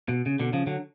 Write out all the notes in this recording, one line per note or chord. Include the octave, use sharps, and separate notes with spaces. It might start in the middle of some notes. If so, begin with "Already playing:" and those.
B2
C#3
B2 D3
C#3 F3
D3 F#3